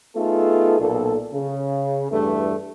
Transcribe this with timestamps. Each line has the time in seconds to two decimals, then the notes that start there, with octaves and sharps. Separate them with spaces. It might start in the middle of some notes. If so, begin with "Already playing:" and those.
0.16 A3 B3 D#4 F4 G#4 A4
0.80 B1 A#2 A4
1.33 C#3
2.11 E2 G2 A3